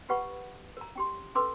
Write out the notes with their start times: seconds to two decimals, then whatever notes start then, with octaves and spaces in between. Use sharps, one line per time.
0.09 F4 G4 B4 F#5 B5 C#6
0.77 A#4 A#5
0.95 C#4 G4 C6
1.35 C#4 A4 B4 C6 D6 E6